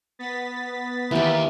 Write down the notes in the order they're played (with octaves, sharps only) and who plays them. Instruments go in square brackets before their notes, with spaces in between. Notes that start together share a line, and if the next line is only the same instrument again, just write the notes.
[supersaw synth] B3 A6 B6
[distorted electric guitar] D#2 [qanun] E3 G4